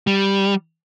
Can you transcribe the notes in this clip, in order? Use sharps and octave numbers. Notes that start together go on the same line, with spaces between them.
G3